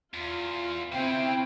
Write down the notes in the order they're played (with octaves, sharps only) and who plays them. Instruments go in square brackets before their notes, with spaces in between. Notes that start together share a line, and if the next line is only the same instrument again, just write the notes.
[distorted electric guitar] E2 [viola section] F4
[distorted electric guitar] C#3 [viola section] C4 E4 [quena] G5